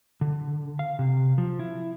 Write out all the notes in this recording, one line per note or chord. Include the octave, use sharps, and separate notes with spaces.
D3
F5
C3
F3
E4